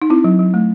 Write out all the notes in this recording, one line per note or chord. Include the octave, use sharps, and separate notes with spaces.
D#4
C4 E4
F#3
F#3
A3